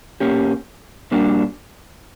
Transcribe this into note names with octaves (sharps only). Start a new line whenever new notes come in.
B2 A#3 C#4 G4
A#2 G3 A#3 D4 F#4